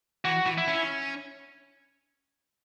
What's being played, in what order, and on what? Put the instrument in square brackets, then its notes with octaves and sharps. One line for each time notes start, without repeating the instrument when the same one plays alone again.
[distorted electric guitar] E3 [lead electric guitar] F#4
[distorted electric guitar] E3
[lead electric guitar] E4
[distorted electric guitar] C#4